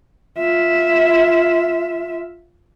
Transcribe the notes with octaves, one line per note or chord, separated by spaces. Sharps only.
F4 E5